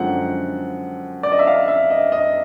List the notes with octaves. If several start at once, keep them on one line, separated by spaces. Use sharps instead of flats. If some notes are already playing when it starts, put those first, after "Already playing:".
Already playing: F#2 D3 F3 G#3 C4 F#5
D5
D#5
E5
F5
E5
D#5
D#5